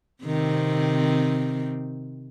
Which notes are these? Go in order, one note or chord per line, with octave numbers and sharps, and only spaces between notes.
C3 D#3 C4